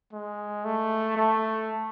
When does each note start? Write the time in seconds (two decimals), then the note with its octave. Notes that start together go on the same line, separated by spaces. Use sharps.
0.13 G#3
0.65 A3
1.17 A3